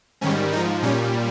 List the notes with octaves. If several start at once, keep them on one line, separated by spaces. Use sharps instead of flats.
G#2 D#3 G3 C#4
G#2 F3 D#4
A#2 G3 C#4